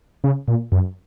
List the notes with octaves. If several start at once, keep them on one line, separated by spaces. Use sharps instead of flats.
C#3
A#2
F#2